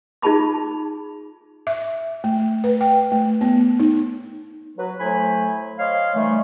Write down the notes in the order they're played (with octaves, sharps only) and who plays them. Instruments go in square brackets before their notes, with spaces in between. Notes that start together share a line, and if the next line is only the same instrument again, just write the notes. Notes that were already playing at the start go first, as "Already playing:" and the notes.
[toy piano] D#4 F4 G#4 A5 B5 D6
[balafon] E5
A3
B4
G5
A3
B3
D#4
[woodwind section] F#3 F#4 B4
A2 F#3 A3 C5 G#5 B5
C5 C#5 D#5 F5
D#3 E3 G3 A3